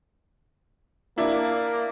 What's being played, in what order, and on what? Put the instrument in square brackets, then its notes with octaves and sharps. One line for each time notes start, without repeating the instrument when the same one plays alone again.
[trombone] A#3 [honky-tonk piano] D4 E4